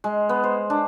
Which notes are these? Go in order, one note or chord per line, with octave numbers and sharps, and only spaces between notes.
G#3
B3
C5
D4